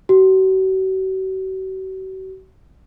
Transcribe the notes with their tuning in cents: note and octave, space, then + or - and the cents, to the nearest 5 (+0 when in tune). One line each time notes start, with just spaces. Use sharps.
F#4 +40